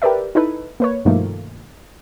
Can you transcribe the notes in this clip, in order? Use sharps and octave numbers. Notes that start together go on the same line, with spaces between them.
G4 A#4 B4 D5 E5
D#4 E4 A4 B4
A#3 B4 C#5
G2 B2 D#3 F3 A3 A#3